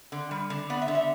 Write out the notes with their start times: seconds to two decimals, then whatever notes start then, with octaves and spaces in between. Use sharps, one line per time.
0.12 D3
0.31 G3
0.50 D3
0.70 B3 D5
0.81 E5
0.88 D3
0.95 E5